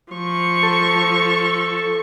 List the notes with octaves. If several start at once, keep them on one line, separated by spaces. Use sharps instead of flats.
F3 C#6
A4